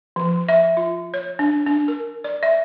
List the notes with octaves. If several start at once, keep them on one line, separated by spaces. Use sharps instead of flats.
F3
E5
F4
C#5
D4
D4
A#4
D5
E5